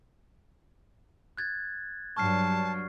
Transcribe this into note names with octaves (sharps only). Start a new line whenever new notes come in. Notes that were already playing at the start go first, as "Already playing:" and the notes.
F#6 G#6 A6
G2 F#3 A5 C#6 F6 C7